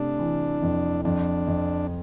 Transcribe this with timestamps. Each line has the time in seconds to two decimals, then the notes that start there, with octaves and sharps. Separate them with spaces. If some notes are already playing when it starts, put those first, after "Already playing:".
Already playing: C3 A3 D4
0.19 E3
0.62 F2
1.05 F2 D4
1.47 F2